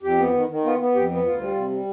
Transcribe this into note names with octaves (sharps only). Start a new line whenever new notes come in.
F2 G4
B3
D#3
D#3
B3 F4
B3
F2 G4
B3
D2 F4
G3
C3
G3